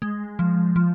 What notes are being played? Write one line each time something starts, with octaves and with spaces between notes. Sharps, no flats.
G#3
F3
F3